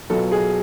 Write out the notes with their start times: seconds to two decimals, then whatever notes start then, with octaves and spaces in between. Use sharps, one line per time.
0.10 B1 B2 F#3 B3 F4 A4
0.32 G#4